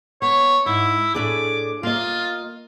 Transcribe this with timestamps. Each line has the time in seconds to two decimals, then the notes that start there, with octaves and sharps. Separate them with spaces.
0.22 B3 C#5
0.66 G#2 E4
1.15 A2 D4 G#4 D6
1.83 A#3 F4 D#5